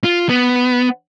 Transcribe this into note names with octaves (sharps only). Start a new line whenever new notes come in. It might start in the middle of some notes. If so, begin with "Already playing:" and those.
F4
B3